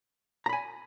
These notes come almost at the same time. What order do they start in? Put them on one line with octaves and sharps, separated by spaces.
A#5 B5 G#5